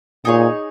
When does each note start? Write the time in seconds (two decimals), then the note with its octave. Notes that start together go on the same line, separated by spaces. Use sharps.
0.25 A#2 D#4 G#4 C#5